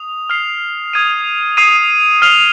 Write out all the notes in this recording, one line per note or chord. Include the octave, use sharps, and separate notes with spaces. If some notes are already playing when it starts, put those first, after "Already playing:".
Already playing: D#6 F7
F6 C7 F7
D#6 G#6 D#7
D#6 C7 D#7
F6 C7 F7